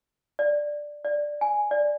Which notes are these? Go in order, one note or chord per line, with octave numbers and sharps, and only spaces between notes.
D5
D5
G#5
D5